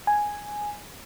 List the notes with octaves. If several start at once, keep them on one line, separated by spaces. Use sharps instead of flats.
G#5